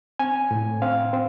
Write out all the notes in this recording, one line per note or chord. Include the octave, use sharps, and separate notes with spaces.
C4 G#5
A2
C4 F5
C4